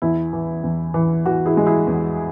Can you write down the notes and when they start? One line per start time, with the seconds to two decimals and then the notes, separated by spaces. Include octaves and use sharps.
0.02 E2 E4
0.33 E3
0.63 E2
0.94 E3
1.26 E3 F#4
1.46 E4 G#4
1.57 G#3
1.66 E4 G#4
1.87 E2